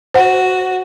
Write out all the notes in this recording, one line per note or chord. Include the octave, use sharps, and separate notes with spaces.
F#4 C5 F#5